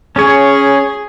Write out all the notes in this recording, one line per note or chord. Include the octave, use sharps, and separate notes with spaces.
C#4 G#4 C#5